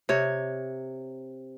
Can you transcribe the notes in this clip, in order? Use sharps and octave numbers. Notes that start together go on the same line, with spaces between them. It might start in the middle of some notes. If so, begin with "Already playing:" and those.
C3 C#5